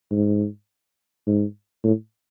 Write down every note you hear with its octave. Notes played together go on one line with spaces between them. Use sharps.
G#2
G#2
A2